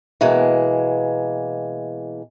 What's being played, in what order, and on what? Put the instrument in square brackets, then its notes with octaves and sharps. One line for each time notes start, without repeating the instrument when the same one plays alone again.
[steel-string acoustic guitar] B2 E3 G#3 A#3